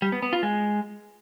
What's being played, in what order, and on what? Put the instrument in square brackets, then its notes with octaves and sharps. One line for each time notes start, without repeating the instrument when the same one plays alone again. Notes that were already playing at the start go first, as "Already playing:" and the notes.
[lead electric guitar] G3
B3
B3
F4
G#3